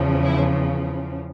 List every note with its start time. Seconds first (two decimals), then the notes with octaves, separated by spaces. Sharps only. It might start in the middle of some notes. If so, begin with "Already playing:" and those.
Already playing: E2 C#3 F3
0.23 E4